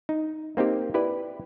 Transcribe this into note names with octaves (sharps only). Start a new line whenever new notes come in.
D#4
A#3 C4 D#4 G4
E4 G4 B4 D5